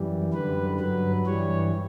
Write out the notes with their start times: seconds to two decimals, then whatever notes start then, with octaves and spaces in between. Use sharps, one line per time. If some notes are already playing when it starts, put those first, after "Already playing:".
Already playing: F#2 E3 G3
0.33 F#2 D3 G3 B4
0.80 G2 F#3 B4
1.26 G2 E3 G3 C#5